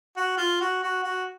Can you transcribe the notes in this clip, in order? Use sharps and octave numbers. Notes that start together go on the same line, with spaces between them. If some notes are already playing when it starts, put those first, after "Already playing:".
F#4
F4
F#4
F#4
F#4